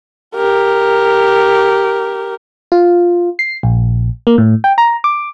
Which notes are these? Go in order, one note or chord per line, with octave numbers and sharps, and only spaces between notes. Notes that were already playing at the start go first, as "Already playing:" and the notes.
G4 A#4
F4
C7
A#1
A#3
A2
G5
A#5
D6